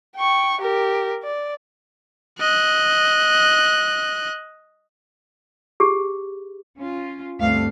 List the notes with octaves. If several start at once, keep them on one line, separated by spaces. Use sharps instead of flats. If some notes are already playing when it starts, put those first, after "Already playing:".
G5 C#6
G4 A#4
D5
D#5 F#6
G4 G#4
C#4 F4
D2 G2 A3 C4 F5